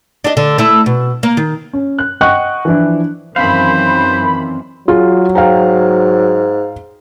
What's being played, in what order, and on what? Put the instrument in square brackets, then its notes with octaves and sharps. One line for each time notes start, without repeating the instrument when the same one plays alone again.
[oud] D4 D#5
D3
A3 E4
B2
A#3
D#3
[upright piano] C#4
F#6
D#5 F#5 G5 C#6 F#6
E3 F3 D4 E4
[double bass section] F#2 D#3 E3 [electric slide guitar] C4 C#4 F5 [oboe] C5 [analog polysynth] B5
[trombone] F#3 [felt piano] F4 G#4
[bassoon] G#2 [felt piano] F5 G5 A#5